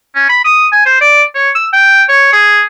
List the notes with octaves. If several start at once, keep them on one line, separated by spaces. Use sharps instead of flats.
C#4
B5
D#6
G#5
C5
D5
C#5
E6
G5
C#5
G#4